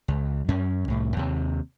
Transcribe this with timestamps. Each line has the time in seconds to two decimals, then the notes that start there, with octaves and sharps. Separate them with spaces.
0.08 C#2
0.49 F#2 C#4
0.88 C2 A2
1.17 D#2 C3